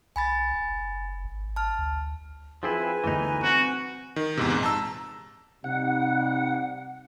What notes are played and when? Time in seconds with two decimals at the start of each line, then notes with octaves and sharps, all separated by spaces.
0.16 B1 G#5 B5 A6
0.54 F#1
1.25 G#1
1.56 A5 F6
1.79 D2
2.63 F3 C4 E4 F4 G#4 B4 G5 G#5
3.04 G1 D2 E3 D#4
3.43 C4 F#4
4.16 D#3
4.37 E2 G#2 C3
4.50 A#1 G#2
4.63 A5 A#5 E6
5.64 C3 G3 D#4 F#5